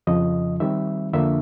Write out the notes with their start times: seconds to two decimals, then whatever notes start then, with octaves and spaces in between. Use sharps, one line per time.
0.07 F2 C#3 F3 D#5
0.60 D#3 G3 C4 E5
1.13 F2 D3 F3 A#3 D4 E5